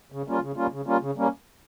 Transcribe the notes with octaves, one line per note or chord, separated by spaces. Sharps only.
C#3
G3 A#3 C#4 F4
C#3
G3 A#3 C#4 F4
C#3
G3 A#3 C#4 F4
C#3
G3 A#3 C#4